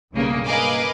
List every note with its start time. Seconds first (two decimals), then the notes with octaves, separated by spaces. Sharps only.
0.12 B1 G2 C#3 A#3
0.46 A#4 B4 D#5 F5 G#5 D6